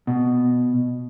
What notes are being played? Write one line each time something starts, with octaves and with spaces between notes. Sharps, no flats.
B2